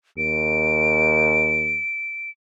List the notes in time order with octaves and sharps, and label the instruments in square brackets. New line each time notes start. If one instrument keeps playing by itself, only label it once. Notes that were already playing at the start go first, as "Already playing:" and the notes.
[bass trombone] D#2 [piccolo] D7